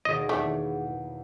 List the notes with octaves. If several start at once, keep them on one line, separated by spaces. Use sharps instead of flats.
D#2 B2 G#4 D5 D#5
E2 A3 D4